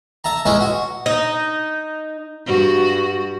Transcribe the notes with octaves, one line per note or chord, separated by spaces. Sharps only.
E5 A5 A#5
G#3 C#4 E4 B4 E5
F#4
D#4
G2 F#4